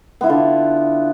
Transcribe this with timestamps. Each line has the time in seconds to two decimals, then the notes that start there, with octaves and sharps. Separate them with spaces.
0.21 B3
0.24 E4
0.27 F4
0.30 D3